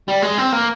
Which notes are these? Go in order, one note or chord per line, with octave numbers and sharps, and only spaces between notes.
G3
G#3
C4
A#3